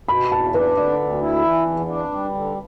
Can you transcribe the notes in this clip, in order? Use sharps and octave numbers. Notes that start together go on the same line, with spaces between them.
B2 B5
E2 A5
D4 B4
D3 D5
D2
E4
E3
E2
D4
G3
D3